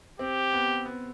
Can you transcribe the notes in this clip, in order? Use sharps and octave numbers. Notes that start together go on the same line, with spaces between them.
C4 G4
B3
B3